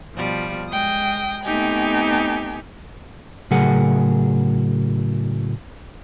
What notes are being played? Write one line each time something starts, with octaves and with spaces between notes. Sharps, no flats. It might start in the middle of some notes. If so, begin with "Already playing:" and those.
B2 F3 G3
G#3 G5 D#6
A3 B3 C4 D#4 G4 G#5
A2 C#3 F#3 G#4 A#4 F#5